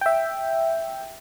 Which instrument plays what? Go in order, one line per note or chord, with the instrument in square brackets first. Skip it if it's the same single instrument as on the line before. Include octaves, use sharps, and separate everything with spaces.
[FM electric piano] E5 G5